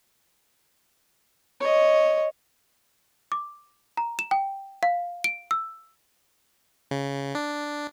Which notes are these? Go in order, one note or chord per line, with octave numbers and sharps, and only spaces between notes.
C#5 D#5
D6
A#5
E7
G5
F5
D7
E6
C#3
D4